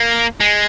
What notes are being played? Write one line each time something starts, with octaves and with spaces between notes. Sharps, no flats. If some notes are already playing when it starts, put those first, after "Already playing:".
Already playing: A#3
G#3